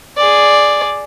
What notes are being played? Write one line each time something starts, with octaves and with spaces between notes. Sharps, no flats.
G#4 D5